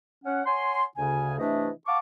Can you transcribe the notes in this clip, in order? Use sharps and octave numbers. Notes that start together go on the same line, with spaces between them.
C#4 F#5
C#5 F#5 G#5 C6
D2 C#3 G#5
C3 E3 A3 D4 D#5 E5
F5 F#5 A5 C#6 D6